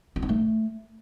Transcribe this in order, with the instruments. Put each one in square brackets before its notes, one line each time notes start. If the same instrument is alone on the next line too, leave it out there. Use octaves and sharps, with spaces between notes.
[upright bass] E4
D#4
A3